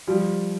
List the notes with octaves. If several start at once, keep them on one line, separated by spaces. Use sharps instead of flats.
F3 G3